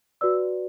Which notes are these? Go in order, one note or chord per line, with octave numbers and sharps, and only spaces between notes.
F#4 B4 D5 E6